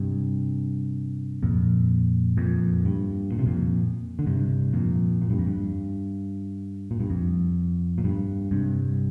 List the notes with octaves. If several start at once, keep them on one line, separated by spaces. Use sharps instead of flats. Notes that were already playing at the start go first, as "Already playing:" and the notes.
Already playing: G2 C3
F2 A#2
F2 A#2
G2
A#2
C3
F2 A#2
D3
G2 C3
F2 A#2
A#2
G2
F2
G2
A#2
G2
F2
A#2
G2
G2 C3